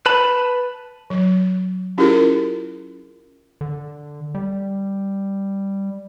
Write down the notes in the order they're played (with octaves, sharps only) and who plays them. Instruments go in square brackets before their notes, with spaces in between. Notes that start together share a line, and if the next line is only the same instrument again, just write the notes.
[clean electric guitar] B4 A5 B5
[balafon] F#3
C#4 E4 F4 G4 G#4 A#4
[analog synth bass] D3
G3